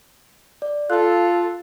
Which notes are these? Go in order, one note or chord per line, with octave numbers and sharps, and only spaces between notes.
D5
F4 A4 F5 F#6